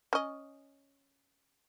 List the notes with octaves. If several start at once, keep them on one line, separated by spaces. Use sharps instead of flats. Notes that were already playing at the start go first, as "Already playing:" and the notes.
C#4 D#5